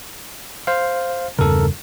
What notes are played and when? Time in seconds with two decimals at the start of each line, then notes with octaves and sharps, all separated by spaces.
0.67 C5 F5
1.39 E2 G2 C#3 A4 A#4